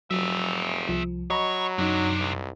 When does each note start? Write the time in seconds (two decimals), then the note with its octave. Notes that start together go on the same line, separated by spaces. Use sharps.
0.11 F1 F#3 G#4 E5
0.89 C2 F3
1.30 F#3 C#5 D#5 A#5 B5
1.78 F#2 C3 D4 D#4
2.19 C2